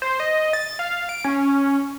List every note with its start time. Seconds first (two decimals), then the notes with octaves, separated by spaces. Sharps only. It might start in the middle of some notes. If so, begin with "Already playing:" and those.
0.02 C5
0.20 D#5
0.53 A6
0.79 F5
1.09 D7
1.24 C#4